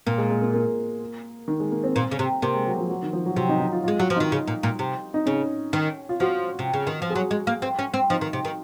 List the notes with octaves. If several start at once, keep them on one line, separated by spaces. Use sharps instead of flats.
A#2 A#3
G#3
G#3
A#3
A#3
D#3
G#3
A#3
C4
A#2
C#3
C3
C3 A#3
G#3
F#3
F3
F#3
D#3
F3
F#3
C3 F#3
D#4
D#4
F4
G#3 F4
F#3 F#4
F3
D#3 D#4
C#3
A#2
A#2
C3
D#4
C#3 C#4
D#3
F4
F3 F#4
C3
C#3
D#3
F3
G#4
F#3 F#4
G#3
A#3
C4
C#4
C4
F3 D#4
D#3
C3
D#3